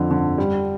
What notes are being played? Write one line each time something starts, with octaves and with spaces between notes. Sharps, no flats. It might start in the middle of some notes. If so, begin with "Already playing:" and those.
Already playing: F2 D3
D3
G3